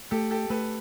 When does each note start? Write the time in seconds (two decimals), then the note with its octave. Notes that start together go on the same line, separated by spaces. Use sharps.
0.11 A3 G4 A4
0.31 G4 A4
0.50 A3 A4 B4